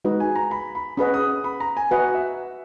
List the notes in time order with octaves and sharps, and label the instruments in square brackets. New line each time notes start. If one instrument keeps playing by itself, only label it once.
[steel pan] G#3 D#4 F#4 B4 D#5
[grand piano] G#5
A#5
B5
B5
[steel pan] C#4 G#4 B4 D#5 F#5 [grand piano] B5
[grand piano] D#6
B5
A#5
G#5
[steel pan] F#4 B4 D#5 F#5 [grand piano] G#5
[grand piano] E5